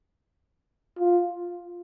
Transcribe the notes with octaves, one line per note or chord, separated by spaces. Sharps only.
F4